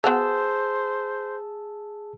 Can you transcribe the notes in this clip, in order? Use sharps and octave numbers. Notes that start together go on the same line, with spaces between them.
B3 F#4 G#4 C5 F5 A5 E6